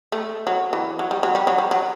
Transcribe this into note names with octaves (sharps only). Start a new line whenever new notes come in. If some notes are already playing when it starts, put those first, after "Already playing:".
A3
F#3
E3
F#3
G3
F#3
G3
F#3
G3
F#3